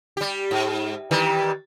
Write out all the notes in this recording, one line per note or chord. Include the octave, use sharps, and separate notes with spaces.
G3 G4
G#2
D#3 E3 G3